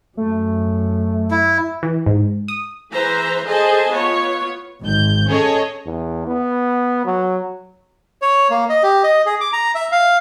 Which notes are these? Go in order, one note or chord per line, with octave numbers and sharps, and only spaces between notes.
F#2 A3
E4
E3
G#2
D#6
E3 G#4 B4 C5 E5 A#5
G#4 A4 C5 D#5 G#5 A5
B3 F4 C#5
G#1 G6
C#4 G#4 A4 C#5 D#5
E2
B3
F#3
C#5
A#3
D#5
G4
D#5
G#4
D6
A#5
E5
F5